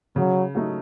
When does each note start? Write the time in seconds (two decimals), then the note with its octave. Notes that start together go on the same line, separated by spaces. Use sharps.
0.16 C#3 F#3
0.55 F#3 A3 D#4